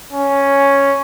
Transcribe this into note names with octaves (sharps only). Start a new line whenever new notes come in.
C#4